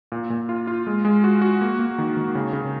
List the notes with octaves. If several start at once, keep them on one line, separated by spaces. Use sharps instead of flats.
A#2
A#2
F4
F4
G#3
G#3
F#4
F#4
A#3
A#3
D#3
D#3
C#3
C#3